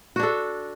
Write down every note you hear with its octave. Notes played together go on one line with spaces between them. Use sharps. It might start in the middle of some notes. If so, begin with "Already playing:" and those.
D4 F#4 A4